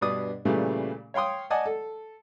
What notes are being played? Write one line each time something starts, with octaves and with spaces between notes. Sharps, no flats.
G2 B2 D4 D5 D#6
A#2 C#3 E3 G3 A3
C#5 F5 G5 C6 D#6
D5 D#5 F#5 G#5 A5 D#6
A4